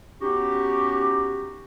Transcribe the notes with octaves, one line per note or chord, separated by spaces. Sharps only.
B3 C#4 D#4 F#4 G4